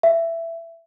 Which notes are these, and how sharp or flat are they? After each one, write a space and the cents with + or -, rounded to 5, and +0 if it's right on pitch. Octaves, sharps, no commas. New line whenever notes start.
E5 +15